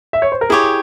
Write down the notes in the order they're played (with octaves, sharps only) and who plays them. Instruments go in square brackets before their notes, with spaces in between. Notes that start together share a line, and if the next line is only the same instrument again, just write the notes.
[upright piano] E5
C#5
C5
A#4
[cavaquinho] E4 G4 C#5 [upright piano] G#4